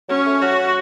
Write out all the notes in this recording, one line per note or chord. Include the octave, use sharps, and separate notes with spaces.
F#3 C#4
A3
F#3 F#4